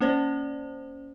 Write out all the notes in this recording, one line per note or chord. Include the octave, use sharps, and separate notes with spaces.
A#3 C#4 C5 D5